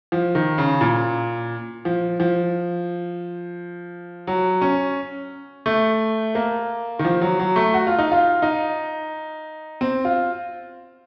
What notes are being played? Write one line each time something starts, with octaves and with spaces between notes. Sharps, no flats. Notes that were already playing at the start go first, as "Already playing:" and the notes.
F3
D#3
C#3
A#2
F3
F3
F#3
C#4
A3
A#3
D#3
F3
F#3
F#3
A3
F#4
F4
D#4
F4
D#4
C4
F4